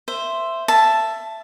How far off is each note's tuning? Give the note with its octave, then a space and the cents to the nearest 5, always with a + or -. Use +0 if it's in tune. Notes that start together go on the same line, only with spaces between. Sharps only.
C5 +0 E5 +10
E5 +20 A5 +0